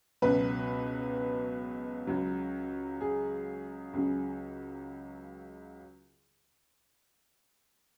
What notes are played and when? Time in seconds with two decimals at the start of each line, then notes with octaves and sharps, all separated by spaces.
0.22 C#2 B2 F#3 B4
2.07 C#2 C#3 F#3
3.01 G#4
3.93 C#2 C#3 F#3